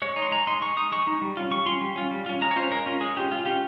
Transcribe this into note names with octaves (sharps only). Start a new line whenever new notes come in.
G#3 C#5
D#4
C6
G#3 A#5
D#4 C6
G#3 C#6
D#4 D#6
G#3 C#6
D#4
G3
C#4 F4
G3 C#6
C#4 F4 C6
G3
C#4 F4
G3
C#4 F4
G#3 A#5
C#5
C#4 F4 C5
G#3 A#4
C#4 F4
G#3 G#4
C#4 F4 G4
G#3 F4
C#4 F4 G4